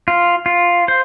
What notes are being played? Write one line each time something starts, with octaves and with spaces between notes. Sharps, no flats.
F4
F4
C5